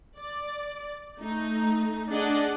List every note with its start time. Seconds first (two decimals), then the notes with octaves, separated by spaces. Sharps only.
0.16 D5
1.19 A3 D#4
2.09 D4 G#4 D5 D#5 F#5